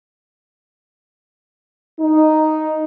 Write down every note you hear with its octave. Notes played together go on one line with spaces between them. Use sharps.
D#4